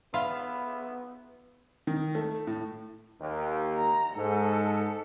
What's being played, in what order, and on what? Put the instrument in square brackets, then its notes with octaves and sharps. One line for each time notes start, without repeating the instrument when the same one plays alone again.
[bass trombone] B3 [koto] F4 [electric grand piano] E5 B5
[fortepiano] D#3
A3
A2
[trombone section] D#2
[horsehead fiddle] A#5
[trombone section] G#2 [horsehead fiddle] A4